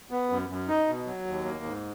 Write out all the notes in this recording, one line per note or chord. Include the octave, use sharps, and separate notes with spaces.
B3
F#2
F#2
D#4
B2
F#3
D#2
A#3
G#2